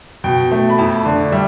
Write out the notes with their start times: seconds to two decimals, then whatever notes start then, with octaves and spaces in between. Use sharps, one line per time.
0.24 B2 G5
0.52 A3
0.70 B5
0.78 F2 A5
1.05 D3
1.32 G3 E5